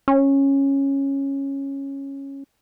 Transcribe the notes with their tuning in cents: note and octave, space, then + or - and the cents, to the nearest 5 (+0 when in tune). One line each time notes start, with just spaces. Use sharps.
C#4 -10